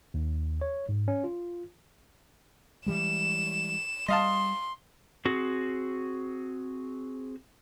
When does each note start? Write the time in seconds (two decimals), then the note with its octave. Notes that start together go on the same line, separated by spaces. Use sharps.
0.14 D#2
0.61 C#5
0.89 G#2
1.08 C#4
1.24 F4
2.86 E3 G3 G#3 E7
4.08 G3 D#5 F5 A5 C6
5.25 C4 F#4 G#4